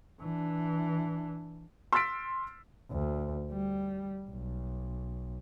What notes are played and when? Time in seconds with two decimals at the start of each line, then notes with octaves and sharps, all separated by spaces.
0.21 E3 D4
1.93 C6 E6 F6 A6 B6 D7
2.91 D2
3.53 G3
4.31 B1